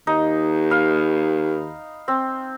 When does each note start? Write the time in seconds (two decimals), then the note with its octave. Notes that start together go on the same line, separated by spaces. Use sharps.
0.07 D#2 D#4
0.71 F5 B5
2.08 C4